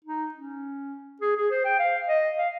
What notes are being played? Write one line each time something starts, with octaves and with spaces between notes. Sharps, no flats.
D#4
C#4
G#4
G#4
C5
G5
F5
D#5
F5